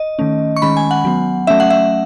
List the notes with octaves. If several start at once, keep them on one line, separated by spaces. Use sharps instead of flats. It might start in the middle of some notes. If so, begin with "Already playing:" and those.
Already playing: D#5
D#3 A3 C#4
C#6
D#3 G#3 C#4 B5
G#5
F#5
F#3 B3
F#3 A3 C#4 E5
F#5
E5